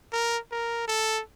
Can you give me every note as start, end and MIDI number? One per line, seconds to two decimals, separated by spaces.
0.13 0.38 70
0.51 0.83 70
0.88 1.21 69